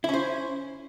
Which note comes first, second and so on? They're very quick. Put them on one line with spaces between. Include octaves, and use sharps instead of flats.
E4 C#4 C5